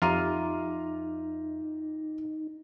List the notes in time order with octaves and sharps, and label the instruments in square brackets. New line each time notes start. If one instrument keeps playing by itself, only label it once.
[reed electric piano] F2 E5 D6 [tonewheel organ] D#4 [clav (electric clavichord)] F4 [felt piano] G4 A#5 D#7